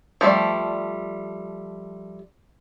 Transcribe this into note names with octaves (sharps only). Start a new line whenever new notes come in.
F3 G3 A3 D5